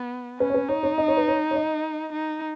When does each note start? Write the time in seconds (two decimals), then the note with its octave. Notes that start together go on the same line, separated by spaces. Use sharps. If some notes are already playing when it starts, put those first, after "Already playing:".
Already playing: B3
0.40 C#4 B4
0.50 C#5
0.54 B4
0.68 D#4 C#5
0.83 C#5
0.98 D#5
1.08 C#5
1.17 B4
1.28 C#5
1.51 C#5
1.55 D#5
2.13 D#4